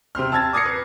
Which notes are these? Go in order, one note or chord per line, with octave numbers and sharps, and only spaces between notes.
C3 C4 C6 F6
A5 E6 G#6 A6
D6 D#6 G#6 A#6 C7 C#7
B4